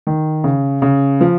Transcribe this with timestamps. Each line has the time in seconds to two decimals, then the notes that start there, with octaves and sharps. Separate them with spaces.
0.07 D#3
0.44 C#3
0.82 C#3
1.21 F3